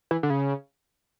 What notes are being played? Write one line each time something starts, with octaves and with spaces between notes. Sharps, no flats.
E3
D3
C#3